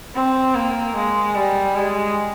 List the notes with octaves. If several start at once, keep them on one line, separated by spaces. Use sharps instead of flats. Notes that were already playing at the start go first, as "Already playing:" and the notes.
C4
A#3
G#3
G3
G#3